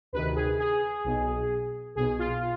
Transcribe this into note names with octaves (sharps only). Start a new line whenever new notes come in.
D2 C3 D#3 B4
G#4
G#4
B1 B2
B1 B2 G#4
F4